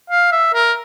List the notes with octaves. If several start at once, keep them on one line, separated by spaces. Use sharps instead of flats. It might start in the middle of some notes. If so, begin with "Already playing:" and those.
F5
E5
A#4